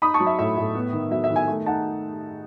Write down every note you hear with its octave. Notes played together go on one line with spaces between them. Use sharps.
D#4 B5 D#6
A5 C#6
F#3
E5
A2 E5
A2
B3
D#3
F#3 E5
E5
D#3
E5 G#5
A3
D#4 F#5 A5